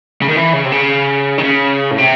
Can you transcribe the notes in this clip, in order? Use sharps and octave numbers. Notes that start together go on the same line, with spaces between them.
C#3
D#3
E3
C#3
C3
C#3
D#3
C#3
A2
C3